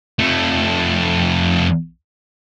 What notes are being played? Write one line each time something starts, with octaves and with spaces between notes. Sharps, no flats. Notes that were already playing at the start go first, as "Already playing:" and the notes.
F2 A3